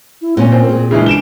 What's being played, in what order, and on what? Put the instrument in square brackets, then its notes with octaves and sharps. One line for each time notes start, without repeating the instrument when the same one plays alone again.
[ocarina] E4
[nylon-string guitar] A#2 A#3 C#4 [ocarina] C4
[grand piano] C4 [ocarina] A#4
[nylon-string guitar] A#2 [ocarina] G#4
[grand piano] C#3 E3 G#3 [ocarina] D4
[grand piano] D7 E7 G7